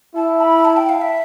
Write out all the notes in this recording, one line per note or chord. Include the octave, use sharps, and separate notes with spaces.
E4 A5
B5
A5
G5
F5
E5